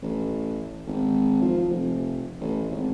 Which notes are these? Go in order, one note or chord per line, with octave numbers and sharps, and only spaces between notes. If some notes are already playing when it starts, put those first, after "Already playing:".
A1
G#1
F3
F1
A1
G#1